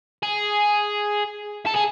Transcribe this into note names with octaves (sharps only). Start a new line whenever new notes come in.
G#4
A4
G#4